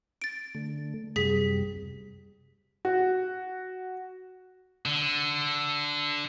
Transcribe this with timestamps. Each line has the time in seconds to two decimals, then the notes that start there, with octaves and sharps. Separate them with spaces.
0.22 A6 D7
0.55 D3 A3
1.16 F#2 C3 G3 G#4 B6
2.85 F#4
4.86 D3